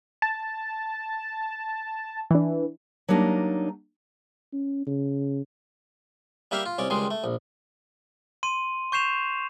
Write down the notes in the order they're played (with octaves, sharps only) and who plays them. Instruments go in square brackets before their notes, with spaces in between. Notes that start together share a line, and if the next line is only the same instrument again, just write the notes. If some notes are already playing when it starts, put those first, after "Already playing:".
[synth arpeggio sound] A5
E3 D4
[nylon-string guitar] F#3 G3 A#3 D4 D#4
[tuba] C#4
C#3
[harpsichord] G3 A#3 E4 G4 E5 F5
F4
C2 C#4 D5
C#2 D#3 G3 G#3 C6
A3
A#1
[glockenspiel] C6 D#7
C#6 G6 C7 E7 F7